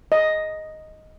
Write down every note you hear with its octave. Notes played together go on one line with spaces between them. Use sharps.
D#5